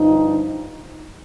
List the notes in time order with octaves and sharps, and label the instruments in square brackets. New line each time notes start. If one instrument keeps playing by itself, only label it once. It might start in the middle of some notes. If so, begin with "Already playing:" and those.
Already playing: [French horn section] G2 D3 F3 D#4